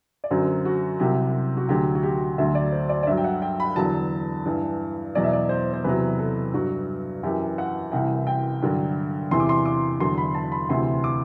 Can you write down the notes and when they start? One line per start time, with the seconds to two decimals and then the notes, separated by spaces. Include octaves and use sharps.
0.24 D5
0.31 F#2 D3 F#3 C5
0.65 F#4
0.99 C2 C3 F#3 G4
1.57 F#4
1.69 D2 D3 F#3 G4
1.95 F#4
2.03 G4
2.38 D2 D3 F#3 E5
2.55 D5
2.72 C5
2.89 D5
3.03 D5
3.07 G2 F#3 E5
3.17 G5
3.24 F#5
3.42 G5
3.60 B5
3.76 E2 D3 F#3 A5
4.45 G2 E3
5.15 E2 B2 F#3 D5
5.24 E5
5.33 D5
5.49 C5
5.73 C5
5.84 E2 C3 F#3 B4
6.19 A4
6.54 G2 F#3 F#4
7.23 F#2 E3 G4
7.58 F#5
7.92 C2 C3 E3 G5
8.27 G5
8.62 G2 D3 F#3
9.31 E2 C3 E3 C6
9.40 D6
9.49 C6
9.65 D6
10.00 E2 D3 F#3 C6
10.18 B5
10.34 A5
10.52 B5
10.69 D2 C3 E3 C6
11.04 D6